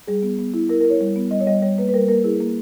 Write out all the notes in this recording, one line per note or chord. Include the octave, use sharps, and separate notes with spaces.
G3 G#4
B3
B3
E4
E4 A#4
E4 A#4
C#5
G3
B3
G3 D#5
C#5
G3 D#5
G3 C#5
A#3 B4
B4
G3 A#4
A#3 A#4
E4 G#4
A#3